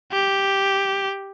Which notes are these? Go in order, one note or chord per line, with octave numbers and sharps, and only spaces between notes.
G4